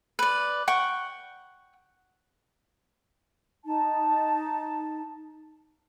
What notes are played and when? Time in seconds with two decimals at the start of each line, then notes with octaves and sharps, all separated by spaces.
0.19 B4 D5
0.68 F#5 G5 C#6
3.65 D#4 A5